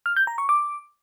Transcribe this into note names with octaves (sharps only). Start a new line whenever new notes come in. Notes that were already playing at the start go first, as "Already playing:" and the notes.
F6
G6
A#5
C#6
D6